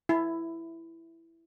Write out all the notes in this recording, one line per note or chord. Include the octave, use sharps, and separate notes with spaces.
E4